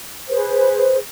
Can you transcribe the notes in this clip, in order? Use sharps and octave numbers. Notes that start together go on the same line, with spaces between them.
G#4 B4 C5